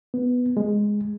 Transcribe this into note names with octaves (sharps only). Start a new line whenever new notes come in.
B3
G#3